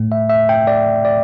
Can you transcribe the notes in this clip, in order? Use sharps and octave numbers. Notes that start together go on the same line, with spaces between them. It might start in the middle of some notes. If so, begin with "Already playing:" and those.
Already playing: A2 A3
E5
E5
G5
D5
D5